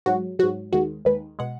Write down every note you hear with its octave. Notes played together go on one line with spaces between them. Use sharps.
G#2 F#3 F#4
G#2 F#3 F#4
D#2 D#3 G#3 F#4
D#2 D#3 G#3 B4
B2 G#3 F#5